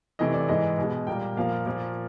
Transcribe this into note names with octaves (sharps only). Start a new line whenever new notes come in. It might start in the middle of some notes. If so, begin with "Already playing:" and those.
C3 E3 A3 D#5
D5
G#2 E3 G#3 D#5
B2
G#3
A#2 G3 A#3 G5
A#2 F3 A#3 F5
A#2 F3 A#3